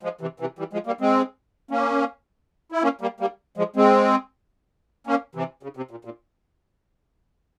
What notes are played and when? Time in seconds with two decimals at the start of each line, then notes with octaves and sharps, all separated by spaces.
0.03 F3 G#3
0.21 C3 E3
0.40 C3 E3
0.59 E3 G3
0.73 F3 G#3
0.87 G3 A#3
1.01 G#3 C4
1.71 A#3 C#4
2.72 E4
2.83 A#3 C#4
3.01 G3 A#3
3.20 G3 A#3
3.57 F3 G#3
3.76 G#3 C4
5.07 A#3 C#4
5.35 C3 E3
5.63 C#3
5.77 C3
5.91 A#2
6.05 A#2